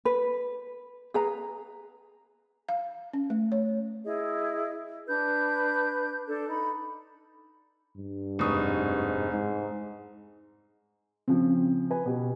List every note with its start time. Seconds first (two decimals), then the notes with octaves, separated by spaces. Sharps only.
0.05 B4
1.14 G#4 B4 A#5
2.69 F5
3.13 C#4
3.30 A3
3.52 C#5
4.05 E4 G#4 D#5
5.07 D4 B4 G6
6.27 D4 A4
6.47 D#4 B5
7.97 G2
8.39 F1 G#2 C#6 D#6
9.32 G#2
11.28 C#3 F3 C4 C#4
11.90 B4 G#5
12.06 B2 G4